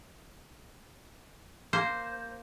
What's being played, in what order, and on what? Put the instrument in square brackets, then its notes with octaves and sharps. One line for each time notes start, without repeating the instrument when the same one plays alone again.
[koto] A#3 C5